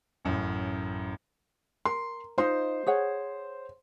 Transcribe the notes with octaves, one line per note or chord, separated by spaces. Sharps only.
A1 F#2 A2
A#4 C6
D#4 F4 C5 C6
G#4 C#5 F#5